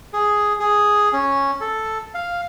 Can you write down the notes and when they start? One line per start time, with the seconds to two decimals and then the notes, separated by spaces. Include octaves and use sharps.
0.13 G#4
0.60 G#4
1.13 C#4
1.61 A4
2.15 F5